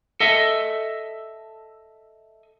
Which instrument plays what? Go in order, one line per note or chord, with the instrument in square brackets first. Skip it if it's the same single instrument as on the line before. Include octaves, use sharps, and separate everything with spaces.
[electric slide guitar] A4 D#5 E5